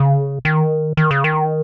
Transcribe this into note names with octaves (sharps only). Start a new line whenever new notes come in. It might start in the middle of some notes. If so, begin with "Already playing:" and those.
Already playing: C#3
D#3
D#3
C#3
D#3